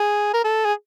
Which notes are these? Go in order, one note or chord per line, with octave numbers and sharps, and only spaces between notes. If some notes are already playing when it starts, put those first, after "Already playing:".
Already playing: G#4
A#4
A4
G#4